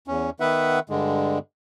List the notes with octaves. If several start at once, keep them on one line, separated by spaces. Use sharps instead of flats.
E2 C#4
D#3 B3 B4 E5 F#5
G2 D3 G#3